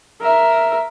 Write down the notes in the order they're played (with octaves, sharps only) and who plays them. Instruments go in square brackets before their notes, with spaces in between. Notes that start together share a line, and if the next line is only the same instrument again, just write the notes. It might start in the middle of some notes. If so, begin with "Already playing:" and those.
[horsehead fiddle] A#4 E5